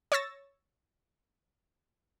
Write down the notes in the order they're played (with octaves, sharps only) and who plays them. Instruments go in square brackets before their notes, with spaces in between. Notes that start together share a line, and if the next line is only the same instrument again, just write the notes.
[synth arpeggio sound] C#5 C#6 E6 A6 A#6